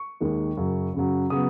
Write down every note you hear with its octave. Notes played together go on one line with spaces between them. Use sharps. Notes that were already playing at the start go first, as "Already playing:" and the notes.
Already playing: C#6
D#2 D#3 G#3
F#2 C#3 F#3
F#2 C#3 F#3
C#3 F#3 B3 D#6